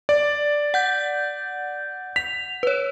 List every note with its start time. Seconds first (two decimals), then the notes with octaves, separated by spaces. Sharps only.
0.09 D5
0.74 F#5 G6
2.16 B6 F7
2.63 B4 C#5